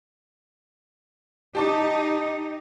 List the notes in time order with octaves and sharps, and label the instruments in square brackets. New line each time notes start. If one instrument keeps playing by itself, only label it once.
[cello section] D#4 [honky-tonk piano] G4 A5 D6